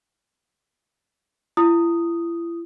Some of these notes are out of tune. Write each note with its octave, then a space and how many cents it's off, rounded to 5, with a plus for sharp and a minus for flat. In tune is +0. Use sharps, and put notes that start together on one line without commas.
E4 +40 D#6 -5